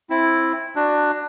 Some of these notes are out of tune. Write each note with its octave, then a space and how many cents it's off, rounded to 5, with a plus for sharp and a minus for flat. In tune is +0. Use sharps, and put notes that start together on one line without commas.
C4 +15 E4 +0
D4 +15 F#4 +0